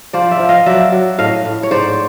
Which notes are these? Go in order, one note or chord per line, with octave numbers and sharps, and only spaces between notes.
F3 C5 D5
D5 E5
F3
D#5 F5
F#3 D5 E5
F#3
A2 D#5 F5
A2
C#5
G#2 C5 D5